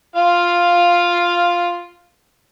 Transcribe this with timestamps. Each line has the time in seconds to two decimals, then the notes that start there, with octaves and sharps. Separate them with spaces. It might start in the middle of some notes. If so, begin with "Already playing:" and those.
0.16 F4 F5